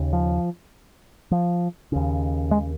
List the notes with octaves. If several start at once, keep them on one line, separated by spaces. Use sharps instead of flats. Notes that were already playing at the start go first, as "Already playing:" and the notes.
Already playing: D#2 C#3
F3
F3
D#2 C#3
G#3